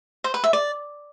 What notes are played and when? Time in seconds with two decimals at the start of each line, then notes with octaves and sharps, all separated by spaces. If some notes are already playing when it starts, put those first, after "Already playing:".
0.24 C5
0.34 B4
0.44 E5
0.53 D5